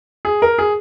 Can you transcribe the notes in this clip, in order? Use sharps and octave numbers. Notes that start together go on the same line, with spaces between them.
G#4
A#4
G#4